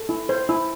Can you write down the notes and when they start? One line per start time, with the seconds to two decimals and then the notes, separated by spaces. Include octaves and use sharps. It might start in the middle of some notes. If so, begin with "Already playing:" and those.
Already playing: A4
0.09 E4
0.29 C5
0.49 E4